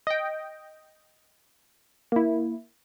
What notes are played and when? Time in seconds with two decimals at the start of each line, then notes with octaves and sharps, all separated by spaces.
0.07 D#5 G5
2.12 A#3 E4